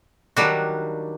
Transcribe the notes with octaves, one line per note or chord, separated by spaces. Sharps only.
D#3 F#3 G3 D4 F#4 E5